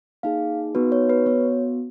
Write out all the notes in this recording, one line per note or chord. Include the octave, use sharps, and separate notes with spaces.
A#3 D#4 G#4 F5
B3 D#4 F#4 B4
C#5
B4
B3 F#4 C#5